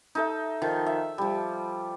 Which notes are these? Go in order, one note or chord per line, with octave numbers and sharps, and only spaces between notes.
D#4 A4 E5
D#3 F3
E5
F3 G3